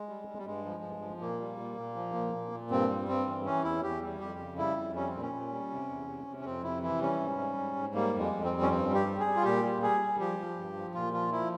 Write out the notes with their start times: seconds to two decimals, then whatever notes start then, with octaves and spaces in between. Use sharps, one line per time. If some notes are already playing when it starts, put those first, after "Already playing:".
Already playing: G#3
0.09 G3
0.28 G3
0.38 G3
0.46 G2 G#3
0.65 F3
0.83 G2
1.02 F3
1.20 A#2 A#3
1.40 G3
1.59 A#2
1.77 A#2
1.96 F3
2.15 A#2
2.33 A#2
2.52 A#2
2.70 G2 C4
2.89 G3
3.08 G2 C4
3.27 E3
3.45 E3 C#4
3.64 E2 E4
3.83 E2 G4
4.02 G3
4.20 F2 G4
4.39 C#3
4.58 G3 E4
4.76 F2
4.95 G3 C#4
5.08 C4
5.14 A#2
5.21 C#4
5.33 A#2
5.51 G3
5.71 C3
5.89 E2
6.08 C3
6.27 C3
6.40 C#4
6.45 F2 C4
6.63 C3 E4
6.83 E3 E4
7.01 G3 C#4
7.20 G#2
7.39 G3
7.57 G#2
7.76 G#2
7.95 G3 A#3
8.13 F2
8.20 G#3
8.32 F2
8.45 C4
8.51 G3
8.62 C#4
8.70 G2 C4
8.89 G3
8.95 G4
9.07 G3
9.20 G#4
9.26 G3
9.36 F4
9.44 A#2 G4
9.64 G3
9.82 G3 G#4
10.01 G3
10.19 F3 G4
10.38 F3
10.57 G2
10.76 F3
10.94 A#2 F4
11.13 F3 F4
11.31 F3 E4